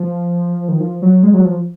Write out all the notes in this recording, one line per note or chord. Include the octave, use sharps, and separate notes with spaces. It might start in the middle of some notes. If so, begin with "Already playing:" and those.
Already playing: F3
D#3
F3
F#3
G#3
F#3
F3